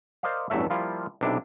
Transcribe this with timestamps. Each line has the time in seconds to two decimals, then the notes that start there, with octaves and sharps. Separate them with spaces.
0.23 A#4 C5 D5 D#5 F5
0.50 A1 E2 G2 F#3 A3 E5
0.70 F3 G3 A#3 E4 F4
1.21 B1 C3 D4 E4